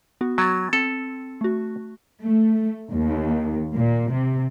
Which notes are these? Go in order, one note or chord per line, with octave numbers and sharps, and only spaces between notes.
B3 F#4
F#3 G#6 A6
C4 A4
A3 F#4
A3
D#2
A#2
C3